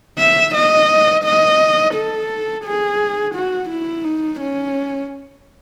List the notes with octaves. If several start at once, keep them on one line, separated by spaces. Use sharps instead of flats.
E5
D#5
D#5
A4
G#4
F#4
E4
D#4
C#4